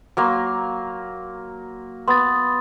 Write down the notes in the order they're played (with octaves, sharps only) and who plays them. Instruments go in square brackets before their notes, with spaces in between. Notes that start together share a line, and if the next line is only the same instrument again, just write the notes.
[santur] F#3 A#3 C6
[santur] B3 [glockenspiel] C6 D#6 A6